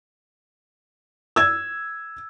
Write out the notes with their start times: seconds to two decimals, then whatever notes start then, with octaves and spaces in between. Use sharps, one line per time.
1.36 E6 G#6